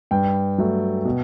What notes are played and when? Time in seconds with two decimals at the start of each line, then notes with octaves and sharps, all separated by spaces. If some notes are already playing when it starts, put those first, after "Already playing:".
0.11 G2 G5
0.58 F#3 A3
1.05 B2